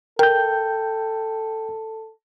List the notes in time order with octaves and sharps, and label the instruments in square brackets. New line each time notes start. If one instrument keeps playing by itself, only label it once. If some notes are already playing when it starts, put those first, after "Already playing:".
[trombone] A4 [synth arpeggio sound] A#4 [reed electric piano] G5 G6